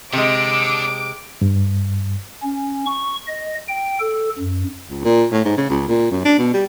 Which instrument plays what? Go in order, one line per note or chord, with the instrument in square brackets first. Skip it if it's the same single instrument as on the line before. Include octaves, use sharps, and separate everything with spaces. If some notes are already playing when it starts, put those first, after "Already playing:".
[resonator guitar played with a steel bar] C3 G#3 [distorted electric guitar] D4 A4 [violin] D6 D7
[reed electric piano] G2
[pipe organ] C#4
C#6
D#5
G5
A4
F#2
[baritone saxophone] C#2
A#2
A2
G#2
C#3
C#2
A#2
F#2
D4
B2
G3